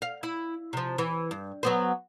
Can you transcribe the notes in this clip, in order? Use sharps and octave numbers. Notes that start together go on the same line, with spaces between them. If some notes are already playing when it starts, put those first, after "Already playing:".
F5
E4
C3 F3
E3
G2
F#3 B3 C5